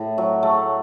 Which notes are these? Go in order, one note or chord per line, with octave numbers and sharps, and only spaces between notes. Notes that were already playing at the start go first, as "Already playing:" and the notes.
Already playing: A2
F#3
A3